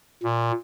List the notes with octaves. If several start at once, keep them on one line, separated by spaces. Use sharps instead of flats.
A#2